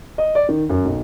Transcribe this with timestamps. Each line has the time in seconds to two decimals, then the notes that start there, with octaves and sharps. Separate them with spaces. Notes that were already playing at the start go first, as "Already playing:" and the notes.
0.18 D#5
0.35 D5
0.49 D#3
0.69 F#2
0.85 B1